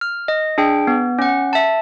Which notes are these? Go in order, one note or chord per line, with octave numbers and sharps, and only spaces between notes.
F6
D#5
D4 G#4 G5
B3
C#4 F#5
E5 A5